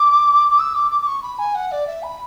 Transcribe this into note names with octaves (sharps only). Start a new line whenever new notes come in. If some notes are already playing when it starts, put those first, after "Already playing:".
Already playing: D6
D6
E6
D6
D6
D6
C#6
B5
G#5
F#5
D5
E5
B5